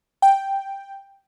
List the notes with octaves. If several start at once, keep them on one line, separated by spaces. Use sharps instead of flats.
G5